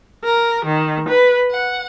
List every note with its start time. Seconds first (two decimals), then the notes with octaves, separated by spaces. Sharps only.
0.24 A#4
0.66 D#3
1.09 B4
1.50 F#5